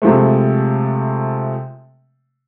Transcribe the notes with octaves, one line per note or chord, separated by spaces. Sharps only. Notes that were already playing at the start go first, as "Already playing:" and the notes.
C3 F3 G#3 A3